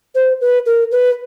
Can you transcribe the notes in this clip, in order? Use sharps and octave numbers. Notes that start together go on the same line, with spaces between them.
C5
B4
A#4
B4